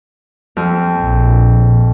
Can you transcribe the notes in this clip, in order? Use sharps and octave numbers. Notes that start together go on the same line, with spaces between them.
F2
A#1